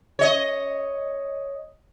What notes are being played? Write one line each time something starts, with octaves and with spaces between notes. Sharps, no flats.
C#5 D#5